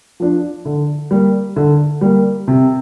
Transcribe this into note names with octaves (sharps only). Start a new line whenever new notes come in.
F3 D4
D3
G3 A#3
D3
G3 A#3
C3